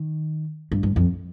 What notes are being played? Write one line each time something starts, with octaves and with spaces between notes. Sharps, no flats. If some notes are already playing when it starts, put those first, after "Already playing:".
Already playing: D#3
G2
G2
F2